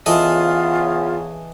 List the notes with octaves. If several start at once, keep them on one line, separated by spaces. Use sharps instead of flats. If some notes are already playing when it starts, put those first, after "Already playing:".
E2 C#3 E3 B3 F4 A4 D#5